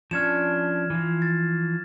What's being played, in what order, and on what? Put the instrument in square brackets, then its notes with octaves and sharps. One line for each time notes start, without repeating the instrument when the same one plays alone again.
[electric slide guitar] F3 C#4 D4 [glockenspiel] F6 G#6 E7
[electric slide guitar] E3 F3
[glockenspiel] A6